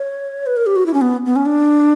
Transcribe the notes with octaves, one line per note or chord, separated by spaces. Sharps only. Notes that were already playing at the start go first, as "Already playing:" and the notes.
Already playing: C#5
B4
A#4
G4
F#4
E4
C#4
B3
B3
C#4
D4